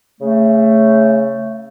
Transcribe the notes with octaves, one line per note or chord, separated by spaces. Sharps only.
C#3 A3